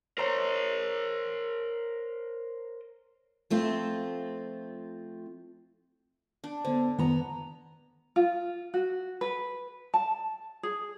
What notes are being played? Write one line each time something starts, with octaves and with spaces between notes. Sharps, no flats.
A#4 C5 C#5 A#5 A#6
F3 A3 C4 F4
D4
D3 B3 C5
D#3 B3 A#5
F4
F#4
B4
A5
G#4